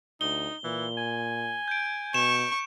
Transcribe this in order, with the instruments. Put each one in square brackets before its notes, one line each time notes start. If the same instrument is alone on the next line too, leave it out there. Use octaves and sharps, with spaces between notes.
[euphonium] D2 [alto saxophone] D#4 [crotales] G7
[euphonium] A#2 [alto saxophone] E3
[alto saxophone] G#5
[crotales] G6 D7
[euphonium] B2 [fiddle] C#6 [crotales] E7